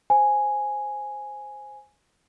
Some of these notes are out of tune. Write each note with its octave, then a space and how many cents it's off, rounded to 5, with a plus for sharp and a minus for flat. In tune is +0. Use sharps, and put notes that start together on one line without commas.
C5 +0 G#5 +0